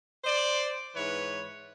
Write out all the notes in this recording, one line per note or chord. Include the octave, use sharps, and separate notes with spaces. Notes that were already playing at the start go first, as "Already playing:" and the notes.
C5 D5
G#2 E3 B4 C#5